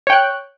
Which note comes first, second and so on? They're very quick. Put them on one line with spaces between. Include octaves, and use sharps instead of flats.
C#5 G5 F#6